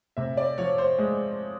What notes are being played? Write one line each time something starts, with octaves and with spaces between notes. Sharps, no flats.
C3 E5
D5
F3 C#5
C5
G#3